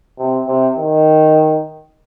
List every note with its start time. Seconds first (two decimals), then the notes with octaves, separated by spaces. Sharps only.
0.18 C3
0.47 C3
0.76 D#3